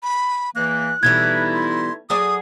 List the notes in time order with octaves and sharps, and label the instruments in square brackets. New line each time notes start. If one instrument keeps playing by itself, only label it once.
[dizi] B5
[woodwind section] E2 E3 A#3 [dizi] F#6
[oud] B2 E3 G3 [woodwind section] A3 D#4 E4 [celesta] G#6
[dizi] C6
[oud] F#3 G#4 D5 [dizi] D#6